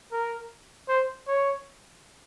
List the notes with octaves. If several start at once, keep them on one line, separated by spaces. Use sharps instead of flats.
A#4
C5
C#5